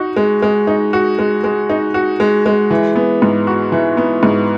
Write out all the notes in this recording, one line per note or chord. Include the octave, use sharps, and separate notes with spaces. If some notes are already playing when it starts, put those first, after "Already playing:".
Already playing: D#4 F#4
G#3
G#3
D#4
F#4
G#3
G#3
D#4
F#4
G#3
G#3
E3
B3
G#2
F#4
E3
B3
G#2